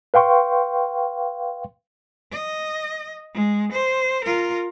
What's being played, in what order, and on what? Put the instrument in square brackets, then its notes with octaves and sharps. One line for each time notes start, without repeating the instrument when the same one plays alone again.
[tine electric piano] B4 F5 G5 C6 C#6
[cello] D#5
G#3
C5
F4 A#4